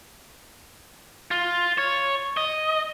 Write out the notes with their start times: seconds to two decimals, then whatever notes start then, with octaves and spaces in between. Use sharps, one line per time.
1.31 F4
1.78 C#5
2.37 D#5